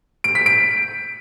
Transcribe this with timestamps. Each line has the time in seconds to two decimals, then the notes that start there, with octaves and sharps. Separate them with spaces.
0.24 D7
0.35 B6
0.46 D7